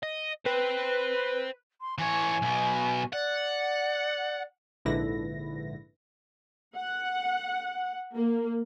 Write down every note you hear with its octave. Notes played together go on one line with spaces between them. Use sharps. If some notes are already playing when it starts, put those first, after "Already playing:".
D#5
B4 C5 G5
C6
E3 C#5 G#5
B1 B2
D5 F#5
A#1 G#2 D3 E4 B4 A#6
F#5
A#3